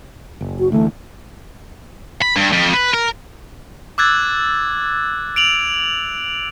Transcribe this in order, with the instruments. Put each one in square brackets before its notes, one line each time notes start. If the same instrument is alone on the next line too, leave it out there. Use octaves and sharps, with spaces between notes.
[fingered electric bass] F#1
[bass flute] F#4
[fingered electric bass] D2 E3 [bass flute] A3
[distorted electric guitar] B5
G2
F2
B4
A#4
[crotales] D6 E6 F#6 G#6 A6
D7 F7 F#7